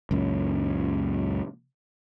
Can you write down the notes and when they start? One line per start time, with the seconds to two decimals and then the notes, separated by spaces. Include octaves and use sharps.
0.11 C#2 F#2 A#2